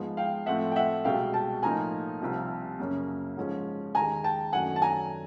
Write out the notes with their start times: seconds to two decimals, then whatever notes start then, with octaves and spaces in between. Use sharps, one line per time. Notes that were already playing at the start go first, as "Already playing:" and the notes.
Already playing: G#2 F3 G#3 B3
0.17 F5 G5
0.46 A2 F3 A3 C4 E5 F#5
0.72 G5
0.76 E5 F#5
1.04 C2 B2 G#3 F5 G5
1.34 G5 A5
1.63 A2 F3 A#3 D#4 G#5 A#5
2.21 C2 C3 F3
2.80 F#2 C#3 F#3 A#3
3.37 G#2 F3 G#3 C#4
3.95 D#2 D#3 G#3 G#5 A#5
4.24 G5 A5
4.53 F#2 D#3 F#3 A3 D4 F#5 G#5
4.76 A5
4.82 G#5 A#5